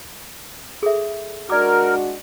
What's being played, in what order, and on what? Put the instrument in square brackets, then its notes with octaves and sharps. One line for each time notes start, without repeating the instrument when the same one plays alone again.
[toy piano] G#4 A4 E5
[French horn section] G#3 D4 F#4 [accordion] A#4 [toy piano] D5 D6